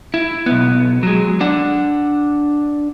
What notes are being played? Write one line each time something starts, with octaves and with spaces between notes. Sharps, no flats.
E4
B1 B3
F#3 G#3
D4 F#5